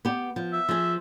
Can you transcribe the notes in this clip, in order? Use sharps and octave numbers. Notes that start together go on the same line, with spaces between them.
B3 G4
F3
E5
F3 G#4